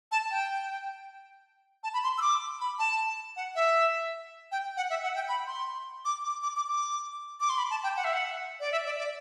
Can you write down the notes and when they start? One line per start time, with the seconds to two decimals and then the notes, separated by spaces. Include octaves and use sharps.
0.12 A5
0.31 G5
1.83 A5
1.94 B5
2.04 C6
2.18 E6
2.22 D6
2.61 B5
2.79 A5
3.36 F#5
3.55 E5
4.52 G5
4.77 F#5
4.90 E5
5.03 F#5
5.16 G5
5.29 B5
5.47 C6
6.05 D6
6.24 D6
6.43 D6
6.56 D6
6.69 D6
7.40 D6
7.49 C6
7.58 B5
7.71 A5
7.83 G5
7.97 F#5
8.04 E5
8.13 F#5
8.60 D5
8.72 E5
8.86 D5
8.99 D5